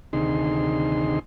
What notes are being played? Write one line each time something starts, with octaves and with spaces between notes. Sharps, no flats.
D2 C3 D#3 D#4 G#4 C6